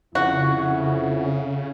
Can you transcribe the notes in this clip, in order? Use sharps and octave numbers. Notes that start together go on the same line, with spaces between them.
F2 C#3 E4 F#4